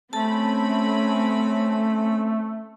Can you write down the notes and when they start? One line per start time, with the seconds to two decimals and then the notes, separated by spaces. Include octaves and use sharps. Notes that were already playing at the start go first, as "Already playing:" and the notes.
0.13 A3 C4 C#4 A4 A5 B5